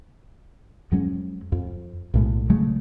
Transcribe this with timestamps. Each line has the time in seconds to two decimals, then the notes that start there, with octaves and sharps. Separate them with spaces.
0.92 F2 F#3 G#3 C#4
1.52 F2
2.14 B1 A2 G#3
2.50 C#3 F#3 G#3 A3